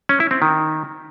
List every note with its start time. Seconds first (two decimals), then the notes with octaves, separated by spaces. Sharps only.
0.09 C#4
0.20 E4
0.31 C4
0.42 D#3